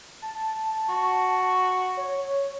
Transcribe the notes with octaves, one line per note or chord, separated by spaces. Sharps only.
A5
F#4
C#5